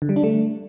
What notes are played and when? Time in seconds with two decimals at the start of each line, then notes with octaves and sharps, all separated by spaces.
0.02 D3
0.09 G3
0.16 D4
0.23 A3